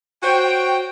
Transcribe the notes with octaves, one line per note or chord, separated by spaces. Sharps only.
F#4 C5 C#5 G5